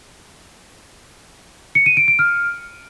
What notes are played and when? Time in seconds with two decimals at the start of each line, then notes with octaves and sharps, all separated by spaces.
1.75 C#7
1.86 D#7
1.97 D7
2.08 D7
2.19 F6